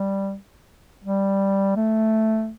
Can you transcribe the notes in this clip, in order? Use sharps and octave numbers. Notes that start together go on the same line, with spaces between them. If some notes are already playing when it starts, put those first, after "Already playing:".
Already playing: G3
G3
A3